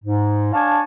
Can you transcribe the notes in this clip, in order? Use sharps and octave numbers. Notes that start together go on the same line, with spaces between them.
G#2
D4 C#5 F5 G#5 A5